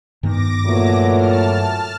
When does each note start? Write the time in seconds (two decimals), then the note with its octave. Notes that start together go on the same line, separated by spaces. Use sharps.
0.23 G2 D#3 B3 D6 A#6
0.66 A#2 E3 F#3 A3
1.15 A5 F6